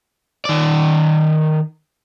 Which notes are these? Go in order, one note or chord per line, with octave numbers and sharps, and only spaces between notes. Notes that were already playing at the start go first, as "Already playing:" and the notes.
D#3 D5